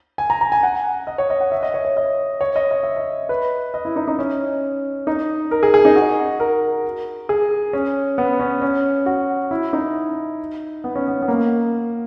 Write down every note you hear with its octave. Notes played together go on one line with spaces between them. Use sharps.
G#5
A#5
A#5
G#5
F#5
D#5
C#5
D#5
F#5
E5
D#5
C#5
C#5
D#5
C#5
D#5
D#5
E5
D#5
B4
D#5
E4
D#4
D#4
C#4
D#4
A#4
G#4
G#4
D#4
F#4
A#4
G#4
C#4
B3
C#4
C#4
F#4
E4
D#4
B3
C#4
B3
B3
A#3